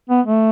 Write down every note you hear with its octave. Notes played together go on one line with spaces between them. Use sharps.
B3
A3